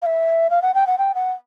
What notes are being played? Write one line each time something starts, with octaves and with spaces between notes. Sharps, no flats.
F5
E5
F5
F#5
G5
F#5
G5
F#5